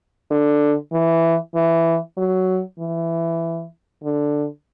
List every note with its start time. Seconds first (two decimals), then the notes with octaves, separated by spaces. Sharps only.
0.31 D3
0.93 E3
1.55 E3
2.17 F#3
2.79 E3
4.03 D3